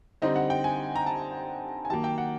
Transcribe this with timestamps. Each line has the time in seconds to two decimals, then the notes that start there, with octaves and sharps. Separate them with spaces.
0.22 D3 G3 C4 D#4 D#5
0.36 F#5
0.50 G5
0.64 G#5
0.96 A#5
1.06 A5
1.85 G#5
1.90 D#3 F#3 A#3 A5
2.04 G5
2.18 F#5